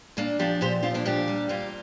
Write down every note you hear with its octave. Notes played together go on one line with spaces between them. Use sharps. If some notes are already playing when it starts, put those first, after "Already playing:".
A#2 A#3 D4
F3 D4 G4
A#2 G4 C5
F3 C4 F4
A#3 D4
A#2 D4 G4
G3
A#2 C4 F4